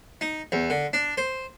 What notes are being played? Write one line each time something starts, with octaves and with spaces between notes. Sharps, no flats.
D#4
E2
D3
D4
C5